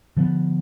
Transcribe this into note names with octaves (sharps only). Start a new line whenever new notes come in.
D3 F3 G#3 B3